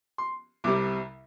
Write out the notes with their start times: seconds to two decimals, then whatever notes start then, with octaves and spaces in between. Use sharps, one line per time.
0.18 C6
0.64 C2 C3 G3 D6